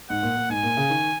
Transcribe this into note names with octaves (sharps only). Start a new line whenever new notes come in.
G#2 F#5
A#2
A#2
G#2 G#5
A#2
C#3
D#3